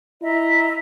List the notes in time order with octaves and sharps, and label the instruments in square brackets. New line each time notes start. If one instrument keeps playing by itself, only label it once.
[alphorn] E4 [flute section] D#5 E5 A#5